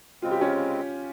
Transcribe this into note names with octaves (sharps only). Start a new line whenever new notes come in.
C#3 G#3 C4 F4
G4
C#4 F4